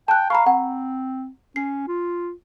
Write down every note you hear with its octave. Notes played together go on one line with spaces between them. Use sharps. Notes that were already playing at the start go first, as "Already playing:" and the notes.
G5 A5 F#6
F5 A#5 B5 C#6
C4 F#5
C#4 C7
F4